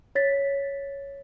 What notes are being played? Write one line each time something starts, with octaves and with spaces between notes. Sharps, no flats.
C#5 A6 B6